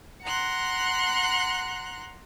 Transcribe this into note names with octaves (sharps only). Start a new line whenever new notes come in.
F#5 A#5 C6 F#6